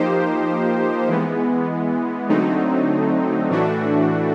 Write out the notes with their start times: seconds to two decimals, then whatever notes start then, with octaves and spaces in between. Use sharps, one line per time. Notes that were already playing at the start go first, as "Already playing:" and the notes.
Already playing: F3 A#3 D#4 G4 C5
1.08 E3 G#3 B3
2.29 D3 F#3 A3 C4 D#4
3.49 A2 E3 A3 D4 F#4